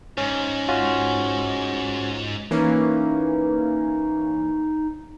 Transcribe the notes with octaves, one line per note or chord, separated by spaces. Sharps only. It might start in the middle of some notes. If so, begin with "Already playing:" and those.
G#2 C#4
C#4 F4 F#4
E3 A#3 C#4 D#4